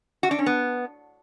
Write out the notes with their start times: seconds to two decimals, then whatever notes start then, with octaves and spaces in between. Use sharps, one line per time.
0.23 F#4
0.31 D4
0.39 C#4
0.46 B3